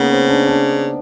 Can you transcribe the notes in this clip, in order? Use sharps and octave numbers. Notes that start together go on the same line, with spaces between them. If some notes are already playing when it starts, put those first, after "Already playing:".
Already playing: C#3 A#3 B3 D#4
C4
D4
D4